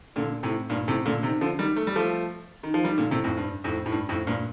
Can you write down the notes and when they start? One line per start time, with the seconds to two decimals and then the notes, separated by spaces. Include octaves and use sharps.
0.16 A#2 D3
0.43 A2 C3
0.70 G2 A#2
0.88 A2 C3
1.05 A#2 D3
1.23 C3 D#3
1.41 D3 F3
1.59 D#3 G3
1.76 A3
1.87 G3
1.96 F3 A3
2.63 D#3
2.74 F3
2.84 D#3 G3
2.98 A#2 D3
3.11 A2 C3
3.24 F2 A2
3.37 G2
3.64 F2 A2
3.86 A2
3.92 G2
4.09 F2 A2
4.27 G2 A#2